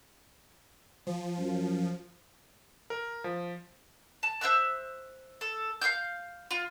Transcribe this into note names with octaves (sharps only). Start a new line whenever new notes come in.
F3
F#2
A#4
F3
A5
C5 E5 E6 F#6
A4
F5 G5 F6 G6
F4